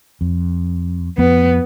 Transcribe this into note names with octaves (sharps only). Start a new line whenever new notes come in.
F2
F2 F3 B3